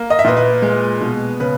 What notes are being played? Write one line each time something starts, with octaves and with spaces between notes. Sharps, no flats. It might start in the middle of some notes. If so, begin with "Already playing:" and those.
Already playing: A#3
D#5
E5
A#2 B4 D#5
B4
G#3
B2
C#3 B4